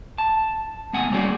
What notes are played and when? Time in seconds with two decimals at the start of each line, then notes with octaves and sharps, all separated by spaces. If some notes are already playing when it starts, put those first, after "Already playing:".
0.18 A5
0.93 A3 B3 F#5 G#5
1.11 G3 A#3 C#4 F#4 G#4 D5